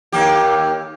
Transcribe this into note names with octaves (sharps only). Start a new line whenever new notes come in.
D#2 A#3 G4